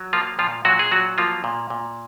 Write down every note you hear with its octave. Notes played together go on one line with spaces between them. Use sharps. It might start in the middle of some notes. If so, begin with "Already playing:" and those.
Already playing: F#3
F3 A#3 F4
A#2 F3 F4
A#2 F#3 F#4
G#4
F#3 F#4
F3 A#3 F4
A#2
A#2